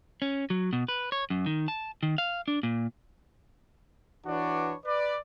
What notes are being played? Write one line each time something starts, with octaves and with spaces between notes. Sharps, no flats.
C#4
F#3
B2
B4
C#5
F#2
D#3
A5
D#3
F5
D4
A#2
E3 D4 F#4 B4 C#5 D5
B4 D5